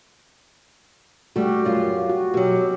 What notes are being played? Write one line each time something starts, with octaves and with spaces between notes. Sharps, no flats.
G3 A3 F#4 G4
F#2 F4 F5
F#4
B2 F#3 G4